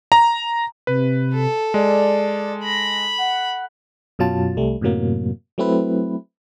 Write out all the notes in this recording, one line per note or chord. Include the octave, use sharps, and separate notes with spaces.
A#5
C3 B4
A4
G#3 D5
B5 A#6
F#5
F#2 B2 F#3 F4 A5
C2 G3 A3
F#2 A2 C3 F#3 A#3
F#3 A3 C4 E4 B4